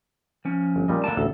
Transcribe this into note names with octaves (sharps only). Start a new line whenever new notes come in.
F3 C#4
G1
A#2 G3 D#5
D3 A#3 A5
A1 D2 A4